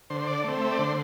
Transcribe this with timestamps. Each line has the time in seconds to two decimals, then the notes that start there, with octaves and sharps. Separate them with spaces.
0.10 D3 C5
0.21 C5
0.27 D5
0.44 A3 C4
0.62 E5
0.71 D5
0.79 D3 C5